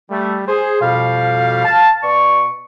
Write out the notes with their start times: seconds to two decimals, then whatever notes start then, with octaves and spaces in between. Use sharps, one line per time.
0.10 G3 A3
0.48 G#4 C5
0.81 F2 B2 G3 F5
1.65 A5
2.03 B2 D5 C#6